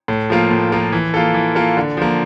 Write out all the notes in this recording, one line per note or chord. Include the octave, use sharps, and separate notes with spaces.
A2
F3 A#3 F4
A2
F3 A#3 F4
E3
A#3 F4 A4
E3
A#3 F4 A4
D3
F3 A#3